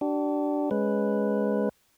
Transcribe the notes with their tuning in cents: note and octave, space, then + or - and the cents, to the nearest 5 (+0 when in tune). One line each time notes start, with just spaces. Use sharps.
D4 +0 G4 -40
G#3 +0 C#4 +0 B4 +0